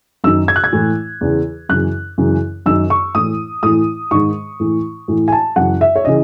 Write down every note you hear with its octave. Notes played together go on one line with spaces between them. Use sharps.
F#2 D#3 E6
G#6
F#6
G#6
A2 E3
E2 C#3 E3
F#2 C#3 E3 F#6
F#2 C#3 E3
F#2 D#3 E6
C#6
A2 E3 D#6
A2 E3 D#6
G#2 D#3 C#6
A2 E3
A2 E3
G#5
A5
F#2 C#3 E3 F#5
E5
C#5
C#3 E3 D#5